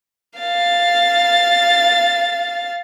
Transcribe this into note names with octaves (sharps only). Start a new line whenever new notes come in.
F5 A6